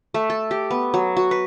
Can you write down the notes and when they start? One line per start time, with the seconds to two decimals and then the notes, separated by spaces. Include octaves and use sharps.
0.14 A3
0.30 A4
0.51 G4
0.71 B3
0.94 F#3
1.17 F#4
1.31 B4